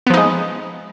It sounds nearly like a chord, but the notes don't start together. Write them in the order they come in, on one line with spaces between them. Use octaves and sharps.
B3 F3 D#4 G#3